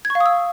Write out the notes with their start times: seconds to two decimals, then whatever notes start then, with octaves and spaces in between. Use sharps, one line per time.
0.05 G#6
0.10 C#6
0.15 F5
0.20 D#6
0.26 E6